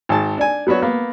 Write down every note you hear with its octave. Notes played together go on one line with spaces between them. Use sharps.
G#1 A5
D4 G#5
F#3 B3 D4 F#4 C#5
A#3 B3